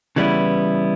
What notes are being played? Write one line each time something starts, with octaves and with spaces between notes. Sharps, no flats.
C#3 E3 G3 B3 E4